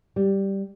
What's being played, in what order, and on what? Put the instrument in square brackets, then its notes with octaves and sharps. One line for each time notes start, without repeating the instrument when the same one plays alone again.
[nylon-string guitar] G3